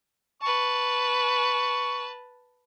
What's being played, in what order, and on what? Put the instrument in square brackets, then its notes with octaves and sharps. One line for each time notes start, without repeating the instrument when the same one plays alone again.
[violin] B4 A5 [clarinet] C#6